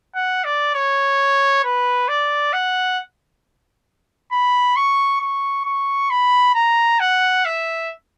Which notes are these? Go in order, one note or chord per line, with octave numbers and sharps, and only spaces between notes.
F#5
D5
C#5
B4
D5
F#5
B5
C#6
C#6
C#6
B5
A#5
F#5
E5